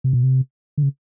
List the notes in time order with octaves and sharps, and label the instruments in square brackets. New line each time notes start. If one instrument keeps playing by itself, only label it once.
[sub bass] C3
B2
C3
D3
C#3